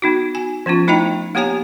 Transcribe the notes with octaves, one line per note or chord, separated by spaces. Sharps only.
B3 D#4 F#4
G#5
F3 B3 C#4 F4
A3 D#4 E4 D#5 G5 A#5
A#3 B3 G4 C#5 G#5 A#5